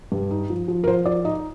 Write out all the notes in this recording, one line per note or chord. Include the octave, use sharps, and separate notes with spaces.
G2
D#4
F3
F3
A#4
F3 C5
F3 D5
D#4 D#5